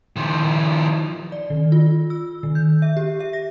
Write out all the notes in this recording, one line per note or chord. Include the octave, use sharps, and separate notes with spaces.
D#3 F3
D5
D#3
F4
E6
D#3
G6
E5
G4
E5
A#6